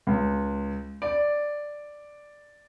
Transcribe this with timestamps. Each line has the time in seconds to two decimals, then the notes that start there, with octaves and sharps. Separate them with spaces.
0.07 C#2
1.02 D5